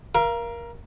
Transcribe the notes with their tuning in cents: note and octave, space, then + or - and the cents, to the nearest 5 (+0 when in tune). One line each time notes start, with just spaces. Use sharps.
A#4 +20 F5 -30